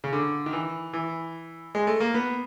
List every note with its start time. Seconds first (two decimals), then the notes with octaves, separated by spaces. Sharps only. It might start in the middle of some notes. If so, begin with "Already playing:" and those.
0.04 C#3
0.13 D3
0.46 D#3
0.53 E3
0.93 E3
1.75 G#3
1.87 A3
2.00 A#3
2.14 B3